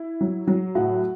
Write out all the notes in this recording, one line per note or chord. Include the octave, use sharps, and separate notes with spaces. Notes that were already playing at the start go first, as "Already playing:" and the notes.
Already playing: E4
F#3
F#3
A2 F#4